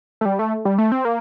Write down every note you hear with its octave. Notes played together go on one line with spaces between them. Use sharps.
A3
G3
A3
G3
A3
C4
A#3